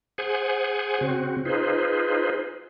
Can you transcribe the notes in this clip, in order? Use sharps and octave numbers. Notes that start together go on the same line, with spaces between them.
G#4 C5 F#5 G#5
C#3 C4 F#4
D#4 F4 G#4 B4 C5